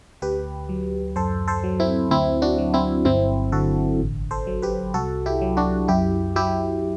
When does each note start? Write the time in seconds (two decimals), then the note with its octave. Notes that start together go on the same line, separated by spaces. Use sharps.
0.22 D2 G4 B4
0.69 F#3
1.16 F#2 A4 C5
1.48 A4 C5
1.64 F#3
1.80 C4 E4
2.11 D2 C4 E4
2.42 D4 F#4
2.58 F#3
2.74 C4 E4
3.05 G1 C4 E4
3.52 D3 F#4 A4
4.00 A1
4.31 A4 C5
4.47 F#3
4.62 G4 B4
4.94 C2 F#4 A4
5.26 E4 G4
5.41 F#3
5.57 D4 F#4
5.88 F#2 E4 G4
6.36 F#3 E4 G4